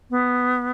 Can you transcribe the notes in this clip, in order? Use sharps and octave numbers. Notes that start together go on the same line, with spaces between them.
B3